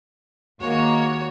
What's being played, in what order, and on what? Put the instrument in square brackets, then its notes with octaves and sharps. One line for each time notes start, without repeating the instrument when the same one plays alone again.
[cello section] D#2 [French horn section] G#3 A#3 [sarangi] F#4 [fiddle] C#5